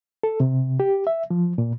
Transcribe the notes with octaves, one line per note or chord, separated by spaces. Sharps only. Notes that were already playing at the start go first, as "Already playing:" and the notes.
A4
C3
G4
E5
F3
A#2